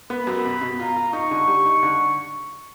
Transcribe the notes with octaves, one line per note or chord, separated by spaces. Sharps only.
B3 B5
F#2
B2
B2
F4 A#5
F4
D#4 C#6
D3
G3
D#4
D3